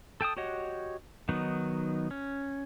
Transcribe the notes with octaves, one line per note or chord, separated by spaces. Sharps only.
A4 G5 A5 D#6
F#4 G4 C#5 D#5 F#5
D#3 F#3 B3 D#4
C#4